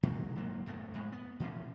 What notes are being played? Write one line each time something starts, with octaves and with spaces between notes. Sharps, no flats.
A#2 D#3 F#3 G#3
F#1 G#2 F#3 A#3
D#1 F#2 A3 B3
F2 A2 G#3
B3
A#2 E3 F3 C#4